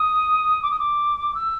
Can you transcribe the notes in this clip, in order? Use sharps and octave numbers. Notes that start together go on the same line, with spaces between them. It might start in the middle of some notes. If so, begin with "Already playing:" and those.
Already playing: D#6
D6
D#6
D6
E6